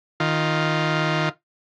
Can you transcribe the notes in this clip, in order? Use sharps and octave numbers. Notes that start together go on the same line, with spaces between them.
D#3 F4